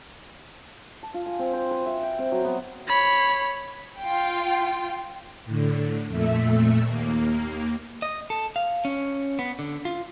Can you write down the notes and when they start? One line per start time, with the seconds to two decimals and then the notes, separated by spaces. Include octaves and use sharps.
1.03 A5
1.14 F4
1.26 G#5
1.39 C4
1.53 C5
1.71 B4
1.86 E5
2.03 G5
2.19 C4
2.32 F#3
2.45 B3
2.88 C#5 B5
4.00 F4 G5
5.46 A2 D3
6.08 F2 A#2 A3 E5
6.85 D#2 A#3
8.02 D#5
8.30 A4
8.56 F5
8.85 C#4
9.39 B3
9.59 D3
9.85 F4